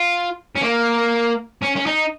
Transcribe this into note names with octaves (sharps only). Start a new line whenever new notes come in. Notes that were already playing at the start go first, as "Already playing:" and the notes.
Already playing: F4
C#4
A#3
C#4
C#4
D#4